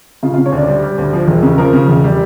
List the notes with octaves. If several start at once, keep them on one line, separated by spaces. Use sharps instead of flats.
C#3 F4
F4
C#3
C#5
D2 D5
G3
G3
D2
F3
E1
C#3
F3 A#4
C#3
E1
G3